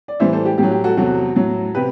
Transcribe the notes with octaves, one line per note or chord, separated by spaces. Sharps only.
D5
A2 E3 G3 C5 E5
A4 C5
G4
A2 F#3 G4
G4
F#4 A4
E2 C3 F#3 F#4 A4
A2 F#3
C3 G4 B4